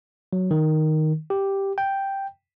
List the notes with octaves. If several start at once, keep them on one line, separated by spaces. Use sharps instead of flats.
F#3
D#3
G4
G5